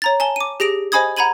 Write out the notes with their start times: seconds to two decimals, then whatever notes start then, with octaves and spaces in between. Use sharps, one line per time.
0.02 C#5 A#5 A6
0.20 G#5 A5 G7
0.36 D6 D#7
0.60 G4 G#4 A#6 D7 F7
0.92 C5 D#5 G#5 B5 D#6 G#6
1.17 F#5 A#5 B5 G#6 D#7 F#7